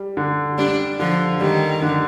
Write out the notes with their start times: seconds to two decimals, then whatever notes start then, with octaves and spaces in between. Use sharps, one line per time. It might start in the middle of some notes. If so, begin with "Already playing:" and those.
Already playing: G3
0.17 D3
0.58 G3 D4
0.99 D3 F3
1.41 D#3 G3
1.82 D3